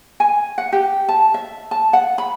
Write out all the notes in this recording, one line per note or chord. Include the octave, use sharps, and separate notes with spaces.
G#5
F#5
G4
A5
E5
A5
F#5
B5